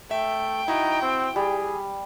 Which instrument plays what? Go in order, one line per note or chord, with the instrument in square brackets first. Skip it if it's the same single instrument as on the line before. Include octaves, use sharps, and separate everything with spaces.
[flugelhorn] A3 [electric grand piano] E5 [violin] G5
[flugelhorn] D#4 [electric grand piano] E4 F#4
[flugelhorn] C4
[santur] G3 [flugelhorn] G#4